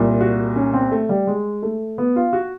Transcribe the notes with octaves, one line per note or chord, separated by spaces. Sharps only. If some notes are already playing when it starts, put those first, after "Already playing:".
Already playing: C2 A#2
F#4
C#4
C4
A3
G3
G#3
A3
B3
F4
F#4